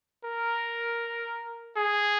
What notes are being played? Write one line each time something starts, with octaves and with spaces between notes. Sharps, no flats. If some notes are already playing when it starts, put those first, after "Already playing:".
A#4
G#4